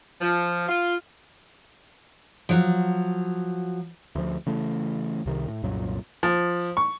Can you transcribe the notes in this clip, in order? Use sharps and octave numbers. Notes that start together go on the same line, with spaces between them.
F3
F4
F3 F#3
D2 F3
C#3 E3 A3
C2 C3 D#3
A2
C2 F#2 A#2 F#3
F3
C#6